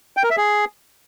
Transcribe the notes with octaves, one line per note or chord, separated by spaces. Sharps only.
G5
A#4
E5
G#4